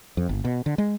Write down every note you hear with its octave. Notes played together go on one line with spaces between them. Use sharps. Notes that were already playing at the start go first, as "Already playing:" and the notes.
F2
G1
B2
D3
G#3